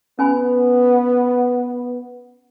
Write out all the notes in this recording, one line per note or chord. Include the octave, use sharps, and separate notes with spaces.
B3 C#4 G#5 B5